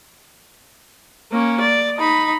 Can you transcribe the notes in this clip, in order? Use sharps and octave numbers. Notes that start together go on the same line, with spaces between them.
A#3 C#4
D5
D#4 B5